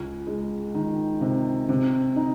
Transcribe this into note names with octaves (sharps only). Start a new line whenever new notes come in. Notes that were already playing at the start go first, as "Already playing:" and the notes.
Already playing: C#2
G#3
D#3
C3
C3
D#4